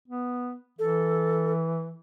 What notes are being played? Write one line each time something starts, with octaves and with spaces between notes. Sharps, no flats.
B3
E3 A4